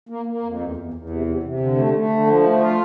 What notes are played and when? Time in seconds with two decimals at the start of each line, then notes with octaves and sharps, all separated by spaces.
0.09 A#3
0.26 A#3
0.43 F2
0.60 E2
0.76 E2
0.94 E2
1.10 C3
1.27 C3
1.43 C3
1.60 D3
1.76 A3
1.94 A3
2.10 D3
2.27 F3
2.44 A3
2.60 F4